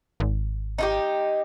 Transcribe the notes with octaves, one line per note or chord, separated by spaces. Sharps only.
G#1
D#4 F4 G4